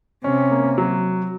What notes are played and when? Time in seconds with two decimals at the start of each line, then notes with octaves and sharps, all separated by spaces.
0.24 C3 C#4
0.51 A#3
0.78 F#3